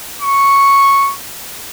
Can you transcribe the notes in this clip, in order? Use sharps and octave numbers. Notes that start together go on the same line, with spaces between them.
C#6